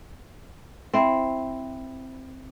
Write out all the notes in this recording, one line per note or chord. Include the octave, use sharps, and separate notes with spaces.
C4 E4